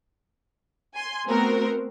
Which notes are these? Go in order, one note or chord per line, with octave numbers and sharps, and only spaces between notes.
G#5 C6
A3 B3 C4 F#4 A#4 C5